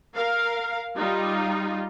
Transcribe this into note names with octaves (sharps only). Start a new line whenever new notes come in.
A#4 F5
G3 D#4 F4